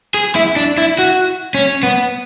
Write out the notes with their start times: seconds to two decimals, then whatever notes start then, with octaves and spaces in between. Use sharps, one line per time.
0.14 G#4
0.35 E4
0.56 D4
0.78 E4
0.99 F#4
1.55 C#4
1.83 B3